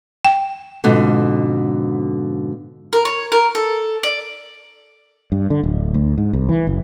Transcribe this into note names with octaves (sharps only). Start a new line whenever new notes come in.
G5
F2 G#2 B2 D3
A#4
C#5
A#4
A4
D5
G2
D3
D1
D2
G#2
C2
E3
F#1